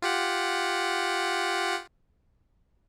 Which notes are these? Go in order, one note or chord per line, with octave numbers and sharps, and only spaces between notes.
F4 G4 F#5